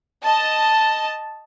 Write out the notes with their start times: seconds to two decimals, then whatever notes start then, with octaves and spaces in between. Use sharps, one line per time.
0.23 D#5 A5